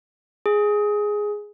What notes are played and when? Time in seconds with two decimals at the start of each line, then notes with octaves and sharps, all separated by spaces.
0.46 G#4